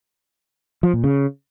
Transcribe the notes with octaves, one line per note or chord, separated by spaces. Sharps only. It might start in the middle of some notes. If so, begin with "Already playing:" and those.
F3
A#2
C#3